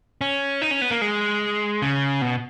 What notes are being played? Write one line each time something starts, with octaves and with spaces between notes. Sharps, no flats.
C#4
D#4
C#4
B3
A#3
G#3
C#3
B2